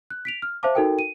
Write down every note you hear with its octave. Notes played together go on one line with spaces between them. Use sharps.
F#6
B6 D7 F7
F6
C5 E5 F5 A5 D6
D#4 F#4 A4 A#4 G5
D#7